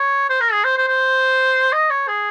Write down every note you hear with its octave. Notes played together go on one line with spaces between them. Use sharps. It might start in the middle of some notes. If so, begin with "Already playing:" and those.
Already playing: C#5
C5
A#4
G#4
C5
C5
C5
D#5
C#5
G#4